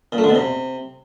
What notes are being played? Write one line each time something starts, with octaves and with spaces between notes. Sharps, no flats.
A#2
A3
D3
B2
C3